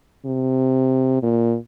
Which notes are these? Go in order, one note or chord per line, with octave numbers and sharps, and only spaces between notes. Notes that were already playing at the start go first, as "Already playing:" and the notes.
C3
A#2